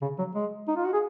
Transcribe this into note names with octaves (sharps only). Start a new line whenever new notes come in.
C#3
F#3
G#3
D#4
F4
F#4
G#4